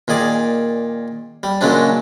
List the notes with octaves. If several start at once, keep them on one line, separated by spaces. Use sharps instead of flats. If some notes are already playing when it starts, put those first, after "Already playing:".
A#2 D#3 G#4 D5
G3
A#2 C#3 F#3 G#3 C#4 D4